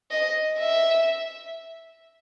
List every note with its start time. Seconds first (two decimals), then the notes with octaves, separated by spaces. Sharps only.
0.11 D#5
0.59 E5